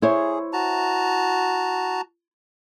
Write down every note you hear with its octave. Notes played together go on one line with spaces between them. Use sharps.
E4 G#4 C5 C#5
F#4 A5 A#5